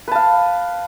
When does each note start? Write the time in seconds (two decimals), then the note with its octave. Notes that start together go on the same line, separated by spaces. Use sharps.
0.08 B4
0.11 A5
0.15 F5